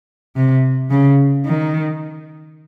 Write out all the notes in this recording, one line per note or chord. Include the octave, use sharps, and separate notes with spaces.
C3
C#3
D#3